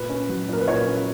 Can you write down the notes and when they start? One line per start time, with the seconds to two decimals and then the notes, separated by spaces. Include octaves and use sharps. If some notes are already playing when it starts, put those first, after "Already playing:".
Already playing: A#2 B4
0.09 C#4
0.29 F#3
0.49 A#2 A#4
0.61 B4
0.68 A#2 C#5
0.87 C#4